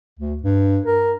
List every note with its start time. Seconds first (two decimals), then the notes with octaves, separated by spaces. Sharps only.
0.19 D2
0.43 G2
0.86 A#4